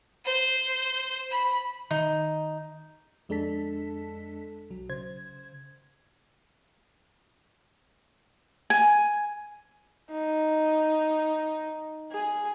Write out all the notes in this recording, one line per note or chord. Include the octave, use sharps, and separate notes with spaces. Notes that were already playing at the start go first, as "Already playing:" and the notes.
C5
B5
D#3 D#4
F2 G#3 D4 A4 A5 B6
B1 F#3
C#3 C5 G#6
G#5
D#4
G#4